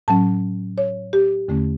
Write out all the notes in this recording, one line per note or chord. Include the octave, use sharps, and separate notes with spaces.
A2 F#3 C#4 A5
C#5
G4
E2 D3 A3 C#4